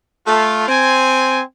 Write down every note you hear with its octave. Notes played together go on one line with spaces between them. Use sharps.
A3 F4
C4 G#5